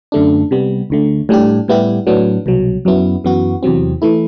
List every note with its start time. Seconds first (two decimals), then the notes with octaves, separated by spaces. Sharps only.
0.12 F#2 D3 A3 D4
0.51 C3 G3 B3
0.90 D2 D3 A3
1.29 A2 G3 D4 G4
1.68 A2 G3 B3 E4 G4
2.07 A2 F#3 B3 D4
2.46 C2 B2 F#3
2.85 F#2 F#3 B3 E4
3.24 F#2 E3 B3 F#4
3.63 E2 C3 F#3 C4
4.02 E3 A3 E4